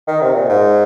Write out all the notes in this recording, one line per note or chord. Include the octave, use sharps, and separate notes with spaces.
D#3
C3
A#2
G#2